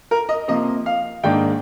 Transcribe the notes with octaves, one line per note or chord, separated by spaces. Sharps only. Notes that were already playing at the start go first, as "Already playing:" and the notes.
A#4
D#5
C3 F3 A#3 D#5
F5
G#2 D#3 A#3 D4 G5